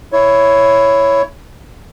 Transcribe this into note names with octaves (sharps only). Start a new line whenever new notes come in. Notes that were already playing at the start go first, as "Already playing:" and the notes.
E4 C#5